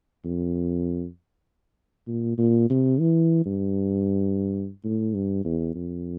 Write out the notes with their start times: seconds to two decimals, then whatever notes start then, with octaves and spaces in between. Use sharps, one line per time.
0.25 F2
2.08 A#2
2.38 A#2
2.70 C3
3.00 E3
3.46 G2
4.84 A2
5.15 G2
5.45 E2
5.75 F2